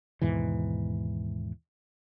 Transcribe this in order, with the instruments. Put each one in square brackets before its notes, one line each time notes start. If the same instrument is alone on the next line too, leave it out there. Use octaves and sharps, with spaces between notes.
[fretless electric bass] D#2 G#2 B2 E3